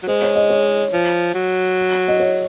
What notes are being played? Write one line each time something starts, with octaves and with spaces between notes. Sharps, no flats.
F#3
G#3 C5
C#5
D#5
C#5
F3
F#3
D#5
C#5